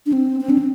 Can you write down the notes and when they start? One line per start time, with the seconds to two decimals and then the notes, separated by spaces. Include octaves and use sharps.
0.06 D4
0.13 C4
0.41 C4
0.50 D4
0.58 C4